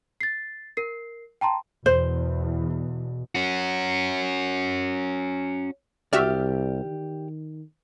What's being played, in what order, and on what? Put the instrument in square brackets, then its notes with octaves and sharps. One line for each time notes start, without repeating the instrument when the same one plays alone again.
[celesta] A6 C7
A#4 C7
G5 A5 A#5 C6
[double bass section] E2 [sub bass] B2 [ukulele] C5
[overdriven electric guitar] C#4 F#4
[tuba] C2 [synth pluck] F#4 E5 F6 [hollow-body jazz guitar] G4 D5
[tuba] D#3